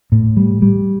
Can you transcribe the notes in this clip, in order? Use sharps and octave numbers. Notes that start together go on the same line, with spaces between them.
A2
G3
G3